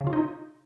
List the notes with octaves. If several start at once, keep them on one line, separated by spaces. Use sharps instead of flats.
C#3
F4
D#4